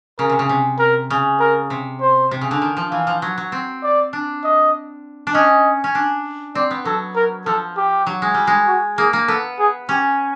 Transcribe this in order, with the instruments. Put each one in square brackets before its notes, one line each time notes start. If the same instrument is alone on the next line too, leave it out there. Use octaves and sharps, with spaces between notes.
[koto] C#3 [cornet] A#4
[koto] C3
C#3
C3
[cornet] A#4
[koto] C#3
[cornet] A#4
[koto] C3
[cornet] C5
[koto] C3
C#3
D3
D#3
F3
[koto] E3 [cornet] F5
[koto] F3
F#3
F#3
C4
[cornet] D5
[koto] D4
[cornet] D#5
[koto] D4
[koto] C#4 [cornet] D#5
[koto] C#4
D4
[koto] C4 [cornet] D5
[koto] B3
[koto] F#3 [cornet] A4
[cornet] A#4
[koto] F3 [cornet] A4
[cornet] G4
[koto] F#3
G#3
G3
G#3
[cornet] F#4
[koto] A#3 [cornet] G#4
[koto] A#3
[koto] B3 [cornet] A4
[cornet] G#4
[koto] C#4 [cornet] G4